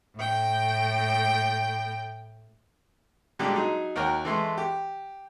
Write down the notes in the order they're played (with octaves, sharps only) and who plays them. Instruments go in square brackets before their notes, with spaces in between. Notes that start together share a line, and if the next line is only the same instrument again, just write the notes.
[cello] A2 G5
[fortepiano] A#2 D3 G3 G#3 G4
F#3 D#4 G#4
D#2 F#4 A#4 C#5 G5
E3 G#3 A3 C6
G4